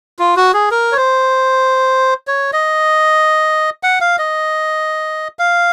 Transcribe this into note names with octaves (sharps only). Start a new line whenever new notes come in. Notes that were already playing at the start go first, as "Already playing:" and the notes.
F4
F#4
G#4
A#4
C#5
C5
C#5
D#5
F#5
F5
D#5
F5